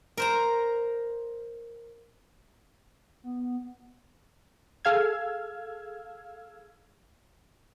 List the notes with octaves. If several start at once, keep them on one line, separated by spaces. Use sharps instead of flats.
A#4 C5 A#5
B3
G#4 A4 F5 E6 F6 G#6